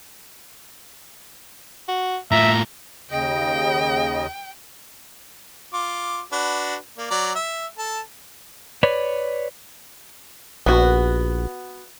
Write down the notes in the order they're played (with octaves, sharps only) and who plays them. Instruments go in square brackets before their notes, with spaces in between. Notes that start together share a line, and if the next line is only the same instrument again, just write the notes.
[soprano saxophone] F#4
[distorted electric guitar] A2 F4 [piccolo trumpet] E5 [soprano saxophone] A#5
[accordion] D#2 C#3 D#5 [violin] G5
[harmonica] F4 D6
D4 F#4 B4
A#3 D5
F#3 D5 A#5
E5
A4 A5
[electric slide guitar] B4 C#5 D5
[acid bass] A#1 [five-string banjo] B3 F#4